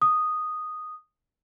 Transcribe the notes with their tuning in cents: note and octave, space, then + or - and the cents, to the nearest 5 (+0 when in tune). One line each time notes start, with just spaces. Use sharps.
D#6 -5